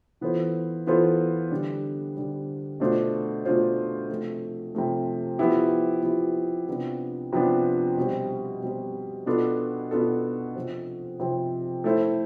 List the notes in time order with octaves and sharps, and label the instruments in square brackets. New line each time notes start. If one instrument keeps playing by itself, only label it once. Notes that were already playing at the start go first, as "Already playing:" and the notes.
[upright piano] E3 B3 F4 A4 C5
E3 B3 F4 A4 C5
D3 G3 D4
D3 G3 D4
B2 A3 D4 F4 C5
B2 A3 D4 F4 C5
C3 F3 A3
C3 F3 A3
F3 B3 E4 G4
F3 B3 E4 G4
C3 F3 B3 D4
C3 F3 B3 D4
B2 G3 C4
B2 G3 C4
B2 B3 D4 F4 A4
B2 B3 D4 F4 A4
C3 F3 C4
C3 F3 C4
A3 E4 A4 C5